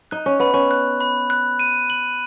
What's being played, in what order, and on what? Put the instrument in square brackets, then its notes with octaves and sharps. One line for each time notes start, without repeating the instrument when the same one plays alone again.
[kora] D#4 [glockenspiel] F#6
[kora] C#4
[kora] B3 [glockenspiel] B5
[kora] C#4
[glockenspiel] F#6
B5
F#6
D#7
F#7